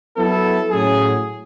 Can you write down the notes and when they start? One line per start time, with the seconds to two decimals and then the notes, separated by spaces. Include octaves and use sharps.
0.17 F#3 B3 E4 A4
0.69 A2 F#3 C#4 G#4